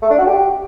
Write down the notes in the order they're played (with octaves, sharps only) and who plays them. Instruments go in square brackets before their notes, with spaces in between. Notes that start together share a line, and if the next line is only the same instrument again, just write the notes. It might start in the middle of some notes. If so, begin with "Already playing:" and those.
[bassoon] A3
D4
F#4
G4